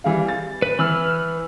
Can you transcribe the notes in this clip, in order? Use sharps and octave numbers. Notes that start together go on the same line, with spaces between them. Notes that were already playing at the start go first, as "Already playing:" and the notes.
E3 G3 F5
A6
B4
E3 B4 E6 F6